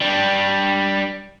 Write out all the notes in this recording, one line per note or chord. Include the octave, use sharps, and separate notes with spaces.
G3 D4